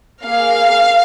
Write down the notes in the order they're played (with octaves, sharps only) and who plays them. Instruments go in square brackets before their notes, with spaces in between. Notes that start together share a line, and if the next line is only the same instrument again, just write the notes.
[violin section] A#3 G#4 F5